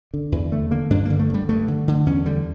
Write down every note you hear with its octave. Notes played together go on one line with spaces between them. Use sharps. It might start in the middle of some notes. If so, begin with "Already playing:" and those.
D3
E2 E3
D3 A3
D3 A#3
G2 D4
D3 A#3
A3
D3 G3
G2 A3
D3
D3
E2 C#4
D3 G3